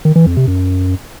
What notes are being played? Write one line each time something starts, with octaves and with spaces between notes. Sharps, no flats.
D#3
E3
F2
C3
F#2